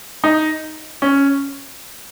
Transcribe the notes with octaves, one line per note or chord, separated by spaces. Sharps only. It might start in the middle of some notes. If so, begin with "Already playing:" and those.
D#4
C#4